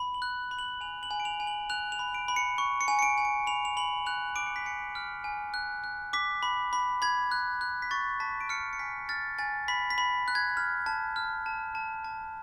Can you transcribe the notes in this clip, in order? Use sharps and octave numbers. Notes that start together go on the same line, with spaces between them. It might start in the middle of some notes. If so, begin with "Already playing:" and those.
Already playing: B5
F#7
F#6
B5
F#7
G#5 F7
F#7
G#5
D7
F7
G#5
F#7
F#6 F7
F7
B5
D7
B5
C#7
C#6
C#7
G#5
C#7
D7
G#5
D7
B5 F7
F7
B5 F#7
F#6 F7
D6 D7
C#7
B6
G#5 C#7
F6
G#5
F#6
F#6
D6 B6
B5
B5
B5 G#6
F#6
F#6
B6
C#6 A6
A5 B6
D7
F6 C#7
C#7
G#5 B6
F6 A6
G#5 A6
B5 B6
B6
B5
F#6
G#6
F6
A5
F6
A5
A5
A5